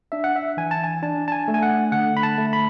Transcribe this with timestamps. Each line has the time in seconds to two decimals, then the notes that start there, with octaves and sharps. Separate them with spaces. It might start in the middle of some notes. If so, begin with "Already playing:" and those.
0.12 D4 E5
0.24 F#5
0.36 E5
0.57 E3 G#5
0.71 A5
0.84 G#5
1.02 D4 A5
1.28 A5
1.32 G#5
1.48 A3
1.54 G#5
1.63 F#5
1.92 D3 F#5
2.17 B5
2.23 A5
2.38 A3
2.53 B5